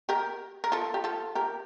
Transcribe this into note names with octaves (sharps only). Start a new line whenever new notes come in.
G4 A#4
A#4
F4 A4
G4
F4 A4
G4 A#4